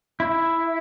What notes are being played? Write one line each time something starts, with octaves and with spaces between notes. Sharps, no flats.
E4